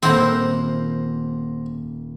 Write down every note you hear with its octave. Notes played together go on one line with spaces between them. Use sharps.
D#1 A#3 C4 E4 C5 F#5 A#5